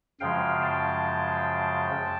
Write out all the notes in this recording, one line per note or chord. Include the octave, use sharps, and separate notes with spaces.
F#2 C#3 F3 G#3 F5 G5
G5 A5